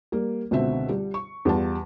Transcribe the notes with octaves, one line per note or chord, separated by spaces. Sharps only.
G3 A#3
C#2 B2 D3 C4 E5
G3
C#6
E2 G3 F4 A5